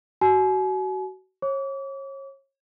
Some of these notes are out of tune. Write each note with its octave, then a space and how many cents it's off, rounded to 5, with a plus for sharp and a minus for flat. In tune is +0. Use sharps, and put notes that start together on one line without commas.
F#4 +25 G#5 +40
C#5 -30 D6 -40